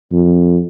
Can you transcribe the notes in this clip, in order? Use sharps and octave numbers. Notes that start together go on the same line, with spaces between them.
F2